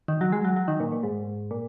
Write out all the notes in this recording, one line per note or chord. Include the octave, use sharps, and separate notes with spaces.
D#3
F#3
G#3
F#3
F#3
D#3
A#2
A#2
G#2
A#2